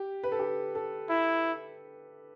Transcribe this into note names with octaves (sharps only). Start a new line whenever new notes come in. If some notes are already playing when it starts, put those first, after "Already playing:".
Already playing: G4
B4
A4
G4
A4
E4